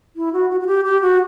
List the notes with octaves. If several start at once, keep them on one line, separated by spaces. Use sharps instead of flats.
E4
F#4
F#4
F#4
G4
G4
F#4